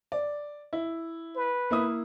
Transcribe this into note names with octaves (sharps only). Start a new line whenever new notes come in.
D5
E4
B4
A#3 E4 D#6